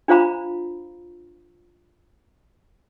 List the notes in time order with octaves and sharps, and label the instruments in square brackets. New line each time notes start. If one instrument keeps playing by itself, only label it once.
[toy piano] D4 F4 C5 F5 A#5 B5